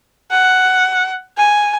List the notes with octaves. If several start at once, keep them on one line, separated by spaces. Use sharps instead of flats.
F#5
G#5